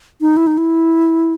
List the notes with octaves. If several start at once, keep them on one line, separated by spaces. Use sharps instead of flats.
D#4
E4
D#4
E4